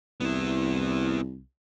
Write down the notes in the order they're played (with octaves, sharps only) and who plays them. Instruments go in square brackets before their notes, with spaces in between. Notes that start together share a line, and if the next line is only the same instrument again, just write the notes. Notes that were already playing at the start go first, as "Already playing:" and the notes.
[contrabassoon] C2 [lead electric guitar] B3 E4